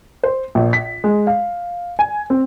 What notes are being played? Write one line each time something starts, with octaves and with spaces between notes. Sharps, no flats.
C5
A#1
B6
G#3
F5
G#5
C4